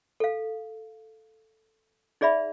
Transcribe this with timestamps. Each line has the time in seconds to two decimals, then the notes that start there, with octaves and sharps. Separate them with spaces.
0.20 A4 F5
2.21 D#4 G#4 D5 E5 B5